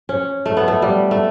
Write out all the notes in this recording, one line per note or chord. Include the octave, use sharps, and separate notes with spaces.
C#4
A3
B3
A3
G3
A3